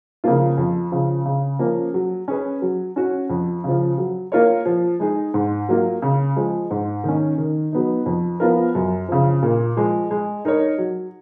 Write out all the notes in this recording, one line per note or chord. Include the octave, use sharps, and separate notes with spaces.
C#3 F3 A#3 F4
F2
C#3 F3
C#3
F3 A#3 C#4
F#3
C#4 G#4 B4
F#3
C#4 F#4
F2
C#3 F3
F#3
A#3 F4 A#4 C#5
F3
G#3 D#4 G#4
G#2
F#3 A#3 F4
C#3
F3 G#3
G#2
D#3 A#3 C#4
D#3
F#3 B3 D#4
F2
F3 B3 F4 A#4
F#2
C#3 F3
A#2
F3 G#3
G#3
D#4 A#4 C#5
F#3